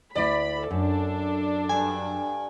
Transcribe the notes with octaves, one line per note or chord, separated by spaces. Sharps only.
D2 E4 D5 B5
F#2 D4 A4
G2 G#5